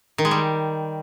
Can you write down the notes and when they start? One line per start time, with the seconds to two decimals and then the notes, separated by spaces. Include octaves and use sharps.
0.18 D#3
0.25 G#3
0.31 G3